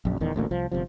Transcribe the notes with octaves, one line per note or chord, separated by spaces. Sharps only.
A#1 F#2
D#1 E2 D#3
D#1 A1 D2 A#3
C2 F3
G1 C2 C3 F3